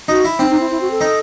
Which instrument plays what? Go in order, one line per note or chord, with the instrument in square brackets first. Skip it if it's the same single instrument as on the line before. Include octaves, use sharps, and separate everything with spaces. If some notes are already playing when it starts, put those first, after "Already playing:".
[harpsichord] D#4 [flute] F#4
[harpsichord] E4
[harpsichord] C4 [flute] D#4
[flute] D#4
E4
E4
F#4
A4
[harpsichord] D#4